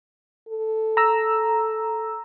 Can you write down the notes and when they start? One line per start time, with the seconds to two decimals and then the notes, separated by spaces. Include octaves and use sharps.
0.49 A4
0.97 A#5 E6